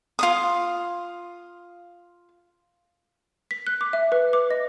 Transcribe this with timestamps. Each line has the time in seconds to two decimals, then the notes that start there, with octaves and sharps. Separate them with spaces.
0.19 F4 C5 D#6
3.51 B6
3.67 F#6
3.81 D6
3.93 E5
4.12 B4
4.33 D6
4.51 D#5